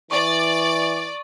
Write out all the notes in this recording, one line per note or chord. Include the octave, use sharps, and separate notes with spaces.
E3 D5 C#6 A6